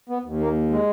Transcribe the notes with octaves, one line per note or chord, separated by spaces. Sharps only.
B3
D#2
A#3
G#3